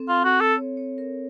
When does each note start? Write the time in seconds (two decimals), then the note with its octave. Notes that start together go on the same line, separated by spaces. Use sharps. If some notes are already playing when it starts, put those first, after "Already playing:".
Already playing: C4 A4
0.08 F4
0.14 C4
0.24 F#4
0.35 C4
0.40 A4
0.56 C#5
0.77 C#5
0.98 A#4